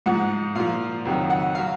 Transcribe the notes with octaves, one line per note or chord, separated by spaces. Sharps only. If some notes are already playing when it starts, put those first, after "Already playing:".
G#2 F3 F#5
A#2 F3 F5
F2 D#3 F#3
F#5
F#3 F5